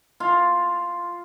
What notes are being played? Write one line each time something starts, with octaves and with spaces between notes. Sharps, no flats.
F4